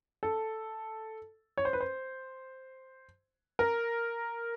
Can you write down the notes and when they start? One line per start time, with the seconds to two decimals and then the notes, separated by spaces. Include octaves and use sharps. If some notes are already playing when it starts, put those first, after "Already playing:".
0.23 A4
1.58 C#5
1.65 C5
1.73 B4
1.80 C5
3.59 A#4